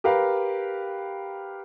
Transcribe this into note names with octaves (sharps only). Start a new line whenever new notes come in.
G4 A#4 B4 F5